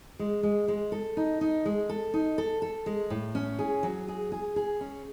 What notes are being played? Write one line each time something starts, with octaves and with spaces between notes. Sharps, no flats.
G#3
G#3
G#3
A4
D#4
D#4
G#3
A4
D#4
A4
A4
G#3
A2
C#4
G#4
F#3
G#4
G#4
G#4
C#4